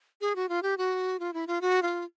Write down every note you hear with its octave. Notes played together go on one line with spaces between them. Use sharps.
G#4
F#4
F4
G4
F#4
F4
E4
F4
F#4
F4